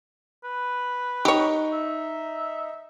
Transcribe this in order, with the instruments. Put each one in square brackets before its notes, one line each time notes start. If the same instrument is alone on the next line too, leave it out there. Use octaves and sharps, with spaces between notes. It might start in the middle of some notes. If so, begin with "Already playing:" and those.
[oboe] B4
[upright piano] D#4 [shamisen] G4 C#5
[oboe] E5